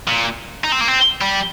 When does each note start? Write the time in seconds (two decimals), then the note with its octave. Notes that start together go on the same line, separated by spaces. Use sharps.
0.08 A#2
0.64 D#4
0.72 C4
0.81 A#3
0.88 C4
1.21 G3